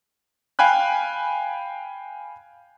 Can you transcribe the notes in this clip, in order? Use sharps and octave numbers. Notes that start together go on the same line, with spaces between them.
F5 G5 G#5 B5 F#6